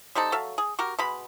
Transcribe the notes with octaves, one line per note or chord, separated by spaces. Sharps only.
G3 C4 D#4 A4
F#3 A4 E5 F5
G#4
F#4 G4 A#4
B2 G#3 B5